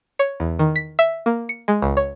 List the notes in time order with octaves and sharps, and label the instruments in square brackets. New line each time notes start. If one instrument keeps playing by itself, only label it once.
[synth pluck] C#5
E2
D#3
B6
E5
A#3
C#7
G#3
C#2
C#5